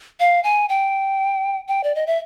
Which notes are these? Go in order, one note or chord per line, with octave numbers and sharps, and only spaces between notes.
F5
G#5
G5
G5
D5
D#5
E5